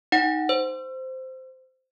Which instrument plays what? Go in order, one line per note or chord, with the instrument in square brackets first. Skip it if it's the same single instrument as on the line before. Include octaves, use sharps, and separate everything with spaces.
[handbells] D#4 F#5
C5